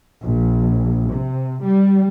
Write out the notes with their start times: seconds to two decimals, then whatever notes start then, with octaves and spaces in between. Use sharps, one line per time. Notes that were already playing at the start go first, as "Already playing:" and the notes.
0.22 A#1
1.10 C3
1.62 G3